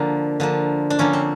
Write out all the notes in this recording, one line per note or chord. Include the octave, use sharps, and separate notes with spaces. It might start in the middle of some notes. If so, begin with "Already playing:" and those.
Already playing: D3 F3 A#3
D3 F3 A#3
D4
D3 F3 A#3 C#4
C4